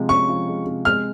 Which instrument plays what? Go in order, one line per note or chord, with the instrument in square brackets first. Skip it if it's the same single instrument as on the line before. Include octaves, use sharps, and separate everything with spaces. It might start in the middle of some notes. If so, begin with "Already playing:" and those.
Already playing: [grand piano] C3 F3 G#3
[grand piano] C#4 [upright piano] C#6
[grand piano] F3
G#3
C3
[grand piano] G#3 [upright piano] F6